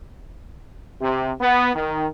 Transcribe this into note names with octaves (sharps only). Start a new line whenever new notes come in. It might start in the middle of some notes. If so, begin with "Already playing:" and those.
C3
B3
D#3